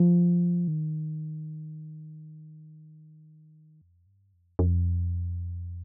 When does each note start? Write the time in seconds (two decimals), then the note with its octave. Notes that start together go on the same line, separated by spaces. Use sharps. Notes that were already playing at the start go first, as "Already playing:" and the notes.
Already playing: F3
0.68 D#3
3.81 F2
4.06 G2
4.33 F2
4.59 F2